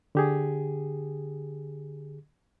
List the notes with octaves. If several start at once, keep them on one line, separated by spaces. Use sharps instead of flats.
D3 G4 G#4